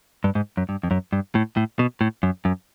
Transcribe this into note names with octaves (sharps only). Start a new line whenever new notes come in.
G2
G#2
F#2
G2
F2
F#2
G2
A2
A2
B2
A2
F#2
F#2